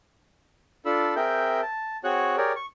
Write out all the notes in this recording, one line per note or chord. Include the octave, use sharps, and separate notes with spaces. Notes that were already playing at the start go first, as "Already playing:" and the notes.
D4 F4 A4 B5 E6
C4 G#4 A#4 E5 G5 G6
A5
C4 F#4 G#4 C#5 C#6 F#6
G4 G#4 A#4 C#5 D5
C#6